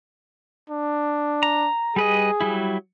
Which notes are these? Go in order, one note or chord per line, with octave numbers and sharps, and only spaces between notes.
D4
A#5
G3 G#4 B4 D#5
F#3 G3 E4